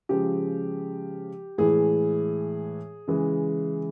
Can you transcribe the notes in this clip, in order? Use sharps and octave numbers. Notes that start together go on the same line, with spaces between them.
C#3 F3 G#3 G4
A2 E3 G#3 G#4
C#3 E3 G#3